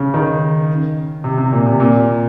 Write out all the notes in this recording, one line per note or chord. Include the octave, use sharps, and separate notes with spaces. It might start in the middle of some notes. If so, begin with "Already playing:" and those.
Already playing: C#3
D#3
C3
C3
A#2
C3
A#2